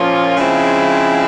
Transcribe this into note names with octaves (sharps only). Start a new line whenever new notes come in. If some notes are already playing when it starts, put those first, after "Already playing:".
Already playing: A#2 F3 A#3 C#4 F4
C#3 F3 G#3 C4 E4